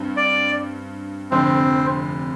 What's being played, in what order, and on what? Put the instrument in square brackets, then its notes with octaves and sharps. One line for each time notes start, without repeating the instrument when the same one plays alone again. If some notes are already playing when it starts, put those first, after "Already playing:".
Already playing: [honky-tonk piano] G2 C4
[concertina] D5
[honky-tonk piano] F1 F2 D3 [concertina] C4